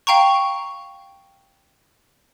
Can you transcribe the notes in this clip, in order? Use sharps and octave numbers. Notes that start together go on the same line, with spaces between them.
F5 G5 A#5 C#6